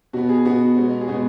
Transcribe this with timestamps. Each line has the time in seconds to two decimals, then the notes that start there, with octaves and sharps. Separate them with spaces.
0.13 B2 B3 F#4
0.29 G#4
0.45 B2 B3 F#4
0.76 B2 G#3 B3
1.01 G#4
1.08 B2 G#3 B3 F#4